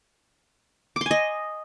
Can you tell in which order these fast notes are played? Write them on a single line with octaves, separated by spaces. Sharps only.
D6 C6 G#5 D#5